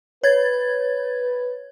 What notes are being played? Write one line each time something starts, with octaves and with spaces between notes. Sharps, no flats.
B4 C#5 G#6 A6